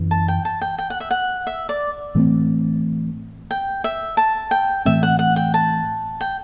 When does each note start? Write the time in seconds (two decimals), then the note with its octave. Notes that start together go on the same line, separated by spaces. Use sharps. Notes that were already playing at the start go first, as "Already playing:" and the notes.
Already playing: F#2 E3
0.11 A5
0.28 G5
0.45 A5
0.61 G5
0.78 G5
0.90 F#5
1.00 E5
1.11 F#5
1.47 E5
1.69 D5
2.15 A2 E3 A3 C4
3.51 G5
3.84 E5
4.17 A5
4.51 G5
4.85 A2 E3 A3 C4 E5
5.03 F#5
5.19 F#5
5.36 G5
5.54 A5
6.21 G5